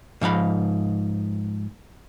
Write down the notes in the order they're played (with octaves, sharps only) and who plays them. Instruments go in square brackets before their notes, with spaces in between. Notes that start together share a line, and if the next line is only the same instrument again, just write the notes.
[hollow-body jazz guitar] G#2 F3 F5 B5